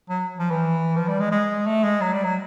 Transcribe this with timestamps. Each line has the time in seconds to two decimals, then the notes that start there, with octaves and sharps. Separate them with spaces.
0.10 F#3
0.38 F3
0.50 E3
0.97 F3
1.08 G3
1.20 G#3
1.32 G#3
1.67 A3
1.83 G#3
2.01 F#3
2.13 G3
2.24 F#3